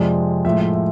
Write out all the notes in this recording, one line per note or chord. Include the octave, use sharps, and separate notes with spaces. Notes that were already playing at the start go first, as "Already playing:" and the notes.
Already playing: F2 C3 F3 G#3 D5
A2 F3 G#3 E5
E5
E5